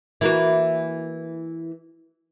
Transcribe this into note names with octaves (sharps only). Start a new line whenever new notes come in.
E3 A#3 F#4